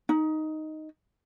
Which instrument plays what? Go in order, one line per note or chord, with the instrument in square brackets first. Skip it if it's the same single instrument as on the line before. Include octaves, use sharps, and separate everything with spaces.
[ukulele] D#4